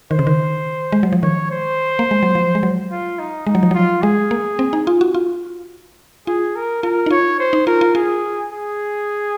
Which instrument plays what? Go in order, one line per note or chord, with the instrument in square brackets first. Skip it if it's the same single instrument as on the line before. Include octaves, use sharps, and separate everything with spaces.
[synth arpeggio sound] D#3 [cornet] C5
[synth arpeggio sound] C#3
D#3
G#3
F#3
F3
[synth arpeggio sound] D#3 [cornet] C#5
[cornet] C5
[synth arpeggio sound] A#3
G#3
F#3
F3
G#3
F#3
[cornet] F4
D#4
[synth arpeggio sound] G#3 [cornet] D#4
[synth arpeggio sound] F#3
F3
[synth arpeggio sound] F#3 [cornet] F4
[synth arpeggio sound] G#3 [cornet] G#4
[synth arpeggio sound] A#3
C4
D#4
F4
F#4
F4
[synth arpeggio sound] F4 [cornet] G#4
[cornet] A#4
[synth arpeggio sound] F4 [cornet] A#4
[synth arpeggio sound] D#4
[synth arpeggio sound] F4 [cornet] C#5
[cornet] C5
[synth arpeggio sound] D#4
[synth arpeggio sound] F4 [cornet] A#4
[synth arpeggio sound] F4
[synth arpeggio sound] F4 [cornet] G#4
[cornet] G#4